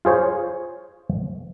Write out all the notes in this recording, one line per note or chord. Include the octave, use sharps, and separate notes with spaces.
F4 G#4 C5 C#5